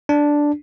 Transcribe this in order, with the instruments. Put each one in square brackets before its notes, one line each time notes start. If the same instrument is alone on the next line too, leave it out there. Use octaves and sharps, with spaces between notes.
[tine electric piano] D4